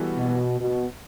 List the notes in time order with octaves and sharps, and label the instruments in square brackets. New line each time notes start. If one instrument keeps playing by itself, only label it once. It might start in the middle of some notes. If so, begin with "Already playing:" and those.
Already playing: [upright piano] E3 G3 B3 F#4 A4
[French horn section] B2
B2